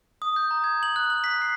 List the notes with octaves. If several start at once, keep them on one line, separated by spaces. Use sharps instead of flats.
D#6
G6
A#5
G#6
F#7
F#6
F#7
B6
C7